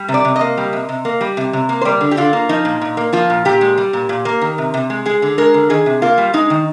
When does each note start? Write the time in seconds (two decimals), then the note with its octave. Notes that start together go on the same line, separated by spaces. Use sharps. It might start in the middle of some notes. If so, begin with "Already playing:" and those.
Already playing: G3
0.08 C3
0.14 D5
0.25 C3
0.36 D#5
0.41 A#3
0.57 G3
0.73 C3
0.89 C3
1.05 A#3
1.21 G3
1.37 C3
1.53 C3
1.69 A#3
1.81 C5
1.85 G3 D5
2.01 D3
2.11 G4
2.17 D3 F4
2.33 A#3
2.49 F3 D#4
2.65 A#2
2.82 A#2
2.97 A#3
3.13 F3 F4
3.30 A#2
3.45 A#2 G4
3.61 G#3
3.78 G3
3.93 A#2
4.09 A#2
4.25 A#3
4.41 D#3
4.58 C3
4.74 C3
4.90 G#3
5.06 G#3 G#4
5.22 D3
5.38 G#3 A#4
5.54 D3
5.70 D#3 G#4
5.86 C3
6.02 A#3 F4
6.18 G3
6.33 G#3 D#4
6.50 D#3